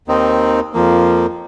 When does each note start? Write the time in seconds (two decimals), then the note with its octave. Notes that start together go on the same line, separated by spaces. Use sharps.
0.08 D#2 D#3 C4 D#4
0.74 F2 F3 A#3